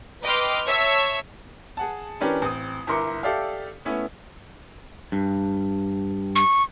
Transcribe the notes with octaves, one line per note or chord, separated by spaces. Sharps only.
B4 D#5 G5 C6 D6 F6
C#5 E5 A5 C#6 E6
G#4 F#5 A5
E3 C#4 D4 G4 A#4 B4
A1 C4 D#6
G1 E4 A#4 C6 D6 C#7
G4 A4 D5 E5 F5
A3 B3 C#4 E4
G2
C#6